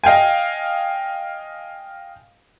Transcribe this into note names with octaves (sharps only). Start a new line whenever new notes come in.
D#5 F5 G5 G#5